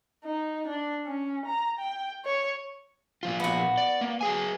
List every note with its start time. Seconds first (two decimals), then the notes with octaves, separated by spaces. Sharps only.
0.25 D#4
0.67 D4
1.06 C#4
1.46 A#5
1.79 G5
2.25 C#5
3.23 A#2 F3 F4
3.40 B3 F#4
3.78 D5
4.01 A#3
4.21 F#3 G#4 G#5